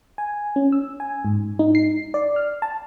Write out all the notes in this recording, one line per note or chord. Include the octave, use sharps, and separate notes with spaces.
G#5
C#4
E6
G#5
G#2
D#4
C7
D5
F6
A5